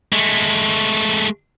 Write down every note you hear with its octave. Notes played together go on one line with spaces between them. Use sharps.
G#3 A3